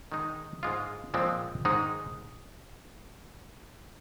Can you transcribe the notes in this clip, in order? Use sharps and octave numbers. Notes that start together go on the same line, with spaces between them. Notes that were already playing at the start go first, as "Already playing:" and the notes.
D#3 G#3 D#4
G#2 G#3 F4
A#2 F3 G#3 C4
G#2 D#3 G#3 D#4